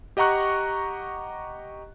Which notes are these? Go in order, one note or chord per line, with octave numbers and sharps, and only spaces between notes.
G4 D#5 F#5 A#5 C#6 F#6